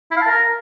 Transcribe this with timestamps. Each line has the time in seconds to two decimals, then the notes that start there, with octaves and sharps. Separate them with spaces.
0.11 E4
0.16 F5
0.22 A5
0.27 A#4